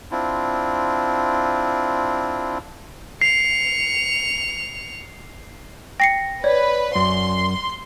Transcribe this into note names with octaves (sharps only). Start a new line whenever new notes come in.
C4 D4 E4 F4
C7 C#7 F7
G5 A#6 C7 C#7
B4 C#5 D5
F#2 C6